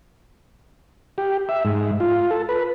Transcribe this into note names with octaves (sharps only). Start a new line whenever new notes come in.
G4
E5
G#2
F4
A4
B4